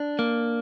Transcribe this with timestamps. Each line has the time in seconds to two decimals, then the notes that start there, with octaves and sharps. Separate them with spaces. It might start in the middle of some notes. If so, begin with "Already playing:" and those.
Already playing: D4
0.19 A#3